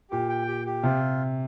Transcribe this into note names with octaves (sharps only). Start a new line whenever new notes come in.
A#2 G4
G5
G4
G4
C3 F4